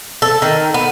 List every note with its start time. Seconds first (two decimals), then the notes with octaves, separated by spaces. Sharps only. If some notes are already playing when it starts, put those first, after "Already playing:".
0.22 A4
0.42 D#3
0.74 B3